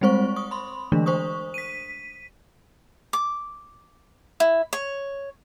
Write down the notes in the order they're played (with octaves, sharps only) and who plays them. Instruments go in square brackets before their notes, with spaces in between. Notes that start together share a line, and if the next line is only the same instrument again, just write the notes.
[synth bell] G3 G#3 C4 C5 C#6
C#6 D#6
B5 C6
D3 E3 G#3 A3 D4
C5 C#6 D#6
B6 D#7
[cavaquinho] D6
E4
C#5